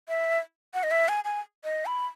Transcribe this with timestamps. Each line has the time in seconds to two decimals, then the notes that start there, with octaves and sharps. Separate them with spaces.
0.09 E5
0.74 F#5
0.83 D#5
0.91 E5
1.08 G#5
1.25 G#5
1.64 D#5
1.86 B5